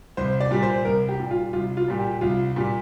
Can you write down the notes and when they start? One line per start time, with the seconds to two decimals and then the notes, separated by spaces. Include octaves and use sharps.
0.17 C2 C5
0.40 D5
0.51 A#2 G3
0.63 C5
0.85 C2 A#4
1.09 G4
1.19 A#2 G3
1.31 F4
1.53 C2 F4
1.77 F4
1.88 A#2 G3
1.99 G4
2.21 C2 F4
2.56 A#2 G3